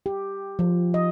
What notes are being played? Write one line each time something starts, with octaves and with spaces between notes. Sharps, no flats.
G4
F3
D#5